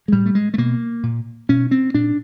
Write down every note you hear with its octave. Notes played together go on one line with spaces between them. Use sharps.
G#3
A2 G3
A3
G#3
A3
B2 A#3
A#2
B2 C#4
C4
A#2 D4